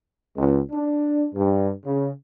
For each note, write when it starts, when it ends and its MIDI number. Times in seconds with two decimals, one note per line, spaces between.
0.37 0.59 37
0.72 1.26 62
1.35 1.68 43
1.85 2.08 49